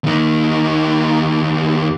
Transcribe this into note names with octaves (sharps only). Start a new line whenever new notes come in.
D#2 D#4